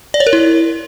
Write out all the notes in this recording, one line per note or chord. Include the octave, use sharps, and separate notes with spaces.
D5
C#5
A#4
E4